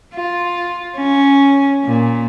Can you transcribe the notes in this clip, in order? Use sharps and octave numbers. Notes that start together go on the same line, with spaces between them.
F4
C#4
A#2